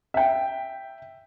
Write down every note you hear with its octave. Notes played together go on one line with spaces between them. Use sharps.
E5 G5